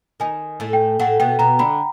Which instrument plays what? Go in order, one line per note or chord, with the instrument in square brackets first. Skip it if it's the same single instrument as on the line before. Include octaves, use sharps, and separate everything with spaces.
[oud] D#3 D#4 [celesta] G#5
[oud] A2 A3
[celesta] G5
[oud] A2 A3 [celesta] F#5
[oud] B2 B3 [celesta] G5
[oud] B2 B3 [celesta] A#5
[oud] D3 D4 [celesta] B5